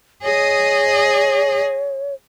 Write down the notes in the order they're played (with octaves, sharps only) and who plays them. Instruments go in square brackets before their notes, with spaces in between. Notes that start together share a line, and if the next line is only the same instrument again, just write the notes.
[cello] G#4 D#5 [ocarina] C#5